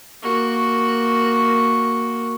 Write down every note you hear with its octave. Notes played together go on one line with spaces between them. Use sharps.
A#3 F#4